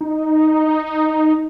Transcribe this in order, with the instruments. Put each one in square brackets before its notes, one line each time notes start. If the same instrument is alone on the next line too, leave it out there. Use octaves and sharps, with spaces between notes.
[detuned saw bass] D#4